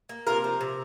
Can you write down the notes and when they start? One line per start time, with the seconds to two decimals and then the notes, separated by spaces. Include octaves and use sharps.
0.09 A#3
0.27 C3 F4 A#4
0.44 F3
0.61 C3